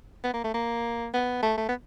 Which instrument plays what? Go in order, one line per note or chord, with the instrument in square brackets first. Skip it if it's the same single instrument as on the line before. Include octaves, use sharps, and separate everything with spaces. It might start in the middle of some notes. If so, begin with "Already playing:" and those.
[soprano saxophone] B3
A#3
A3
A#3
B3
A3
A3
B3